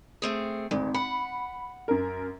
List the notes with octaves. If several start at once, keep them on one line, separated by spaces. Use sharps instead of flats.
A3 C4 G#4
G#1 D2
F#5 B5
F#2 A#4